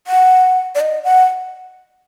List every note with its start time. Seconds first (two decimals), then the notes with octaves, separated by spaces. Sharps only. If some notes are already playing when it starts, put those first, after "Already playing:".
0.07 F#5
0.75 D5
0.81 D#5
1.04 F#5